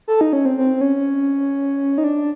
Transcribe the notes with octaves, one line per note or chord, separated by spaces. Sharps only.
A4
D#4
C#4
C4
C4
C#4
D#4
D4